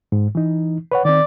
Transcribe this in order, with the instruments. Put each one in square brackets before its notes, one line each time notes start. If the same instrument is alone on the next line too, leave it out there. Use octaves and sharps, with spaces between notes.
[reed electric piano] G#2
E3 D#4
B4 C#5 F#5
[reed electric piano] D#3 C4 [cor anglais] D5